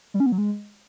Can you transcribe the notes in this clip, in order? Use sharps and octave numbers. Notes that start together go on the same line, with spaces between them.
G3
C#4
B3
F#3
G#3